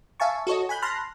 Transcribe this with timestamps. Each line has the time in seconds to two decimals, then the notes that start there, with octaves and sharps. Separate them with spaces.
0.20 E5 F5 G#5 A5 C#6
0.47 F#4 A4 C#5 D#5
0.69 G#5 B5 F#6 G6
0.82 A5 B5 C6 F6 F#6 A#6